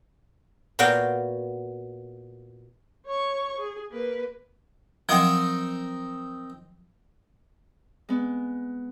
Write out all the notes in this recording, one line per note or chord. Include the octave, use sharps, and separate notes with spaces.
A#2 B3 F#4 F5 G5 A#5
C#5 C#6
G#4
A#3 B4
F3 F#3 C4 D#4 A#4
G#3 B3